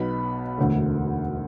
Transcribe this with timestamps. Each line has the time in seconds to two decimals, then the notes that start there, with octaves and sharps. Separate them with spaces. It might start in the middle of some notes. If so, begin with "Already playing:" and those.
Already playing: B1 B2 B3 B5
0.58 E1 D2 D3 A3